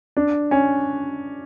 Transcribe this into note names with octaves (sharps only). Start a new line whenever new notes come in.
D4
C#4